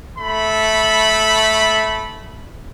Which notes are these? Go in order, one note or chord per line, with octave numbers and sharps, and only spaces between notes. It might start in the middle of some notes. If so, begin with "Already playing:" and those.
A3 B5